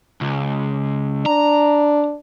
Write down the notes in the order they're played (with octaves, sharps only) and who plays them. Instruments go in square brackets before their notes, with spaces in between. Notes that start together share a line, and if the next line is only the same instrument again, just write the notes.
[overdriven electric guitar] C#2
[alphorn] D4 [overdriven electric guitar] A#5